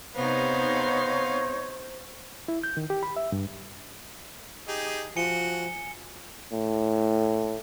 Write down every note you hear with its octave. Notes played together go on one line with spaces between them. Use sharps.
C3 B3 D#4 C5 C#5 F5
E4
G6
D#3
G4
B5
E5
G2
D#4 G4 G#4
F3 F#4 G#5 C#7 G7
A2